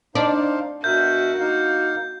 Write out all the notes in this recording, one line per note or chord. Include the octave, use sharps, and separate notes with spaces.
D4 D#4 C5 F5
B2 F#4 A#4 E5 G6
A#3 D#4 F5